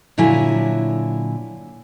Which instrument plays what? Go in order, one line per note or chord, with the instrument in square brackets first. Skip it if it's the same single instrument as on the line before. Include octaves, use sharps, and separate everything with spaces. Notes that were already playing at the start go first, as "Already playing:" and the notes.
[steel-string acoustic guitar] A#2 D3 F#3 E4 G#5